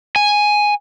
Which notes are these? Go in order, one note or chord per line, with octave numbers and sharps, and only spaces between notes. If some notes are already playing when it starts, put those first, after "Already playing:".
G#5